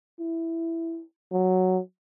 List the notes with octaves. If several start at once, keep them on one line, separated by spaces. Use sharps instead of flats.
E4
F#3